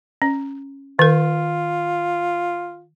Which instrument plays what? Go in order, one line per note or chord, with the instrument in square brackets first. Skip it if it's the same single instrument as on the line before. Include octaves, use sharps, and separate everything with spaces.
[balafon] C#4
[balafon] D#3 A#4 [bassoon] F4